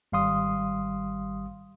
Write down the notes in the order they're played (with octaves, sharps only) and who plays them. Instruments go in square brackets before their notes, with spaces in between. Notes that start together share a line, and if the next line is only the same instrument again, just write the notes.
[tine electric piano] G#1 G3 F5 C6 D#6